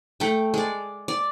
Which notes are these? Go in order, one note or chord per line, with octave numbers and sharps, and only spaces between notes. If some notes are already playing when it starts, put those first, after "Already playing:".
A3 G5
G#3 D5
D5